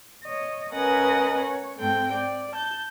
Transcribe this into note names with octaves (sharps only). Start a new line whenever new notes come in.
C#5 D#5
C#4 A#4 B4 D#5 F#5 G#5
C#5
G#2 C4 A4 G5
D5
A5 G6